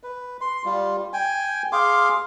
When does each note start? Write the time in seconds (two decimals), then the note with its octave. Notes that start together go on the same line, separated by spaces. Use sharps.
0.03 B4
0.41 C6
0.65 G3 F4
1.13 G5 G#5
1.73 G#4 F5 C6 D6